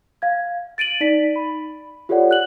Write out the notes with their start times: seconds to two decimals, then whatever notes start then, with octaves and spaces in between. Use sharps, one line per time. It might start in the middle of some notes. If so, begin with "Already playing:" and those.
0.22 F5 G#6
0.78 A6 D7 D#7 F#7
1.01 D#4 D5 B6
1.36 B5
2.09 F4 G4 A4 C#5 D5 F#5
2.31 F#6 F#7